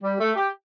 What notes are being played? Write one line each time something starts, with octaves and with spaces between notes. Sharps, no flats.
G3
A3
G4